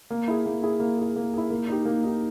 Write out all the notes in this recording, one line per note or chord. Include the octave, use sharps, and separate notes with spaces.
A#3
E4 G#4
A#3
E4 G#4
A#3
E4 G#4
A#3
E4 G#4
A#3
D#4 G4
A#3
D#4 G4